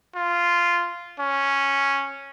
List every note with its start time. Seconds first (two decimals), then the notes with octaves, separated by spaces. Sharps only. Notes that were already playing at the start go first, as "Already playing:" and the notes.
0.15 F4
1.19 C#4